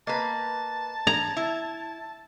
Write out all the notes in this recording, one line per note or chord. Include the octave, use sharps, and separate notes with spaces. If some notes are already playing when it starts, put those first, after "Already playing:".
A#3 B4 D#5 A5 A#5
A#5 G#6
E4